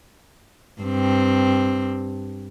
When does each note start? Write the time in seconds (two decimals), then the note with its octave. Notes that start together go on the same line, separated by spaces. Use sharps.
0.82 G2 C4